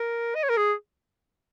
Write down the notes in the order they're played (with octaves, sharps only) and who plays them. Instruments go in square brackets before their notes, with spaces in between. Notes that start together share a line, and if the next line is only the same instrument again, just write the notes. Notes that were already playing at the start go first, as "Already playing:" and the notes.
Already playing: [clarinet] A#4
D#5
C#5
A#4
G#4